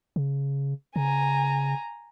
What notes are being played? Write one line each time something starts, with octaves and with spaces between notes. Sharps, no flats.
C#3
C#3 G#5 A#5